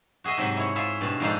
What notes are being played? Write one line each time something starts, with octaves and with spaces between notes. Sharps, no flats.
F#4 G#4 D#5 E5
G#2 C3 F#3
E4 C#5
E4 F4 G#4 E5
G2 B2 A5
G#2 F3 G#3 D4 D#4 A4